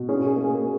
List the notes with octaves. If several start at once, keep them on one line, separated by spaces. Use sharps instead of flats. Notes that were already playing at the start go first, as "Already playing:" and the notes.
Already playing: B2
C#4 G#4
G#4
A#3
G#4
A#3